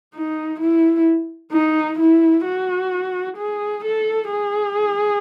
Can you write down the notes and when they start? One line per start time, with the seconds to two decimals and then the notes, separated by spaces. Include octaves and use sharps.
0.14 D#4
0.60 E4
1.52 D#4
1.99 E4
2.46 F#4
3.38 G#4
3.85 A4
4.31 G#4